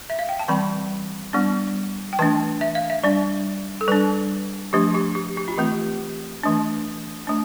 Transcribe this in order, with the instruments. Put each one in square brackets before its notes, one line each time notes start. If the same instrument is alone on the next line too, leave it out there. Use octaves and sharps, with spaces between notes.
[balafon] E5
F5
G5
A5
E3 G3 C4 B5
G3 B3 D4
G5
E3 A3 D4 A5
E5
F5
E5
G3 D4 D5
A4
G3 D4 B4
F3 A3 D4 G4
G4
G4
G4
F4
E3 A3 C4 G4
E3 A3 D4
A3 D4